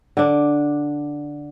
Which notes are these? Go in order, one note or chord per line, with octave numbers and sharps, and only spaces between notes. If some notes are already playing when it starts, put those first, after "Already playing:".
D3 D4